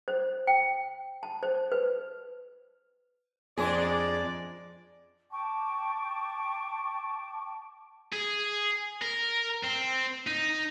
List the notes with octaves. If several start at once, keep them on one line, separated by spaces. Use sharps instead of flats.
C5
G5
A5
C5
B4
F2 G#3 D4 G#4 D5
G5 A5 C#6 D6
G#4
A#4
C4
D#4